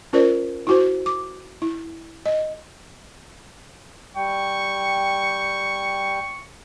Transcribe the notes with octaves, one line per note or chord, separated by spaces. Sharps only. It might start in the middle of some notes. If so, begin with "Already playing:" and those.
C#4 F4 A#4 C5 D5
E4 F#4 C5
D6
E4
D#5
G3 G5 C#6